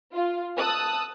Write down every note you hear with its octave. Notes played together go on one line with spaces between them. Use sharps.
F4
A5 D#6 E6 F#6